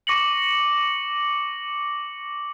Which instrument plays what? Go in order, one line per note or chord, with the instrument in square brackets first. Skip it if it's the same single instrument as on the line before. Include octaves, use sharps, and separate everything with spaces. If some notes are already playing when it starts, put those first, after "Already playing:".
[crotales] C#6 D6 A#6 C#7 F#7